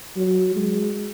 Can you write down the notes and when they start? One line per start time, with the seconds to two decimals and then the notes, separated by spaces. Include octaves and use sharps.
0.17 F#3
0.56 G#3